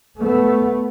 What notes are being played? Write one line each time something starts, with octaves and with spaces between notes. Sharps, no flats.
A3 B3